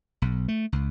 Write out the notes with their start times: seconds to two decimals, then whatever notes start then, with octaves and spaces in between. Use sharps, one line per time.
0.22 B1
0.48 A3
0.72 C#2